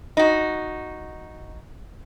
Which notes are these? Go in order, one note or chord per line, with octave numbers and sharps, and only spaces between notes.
D#4 F#4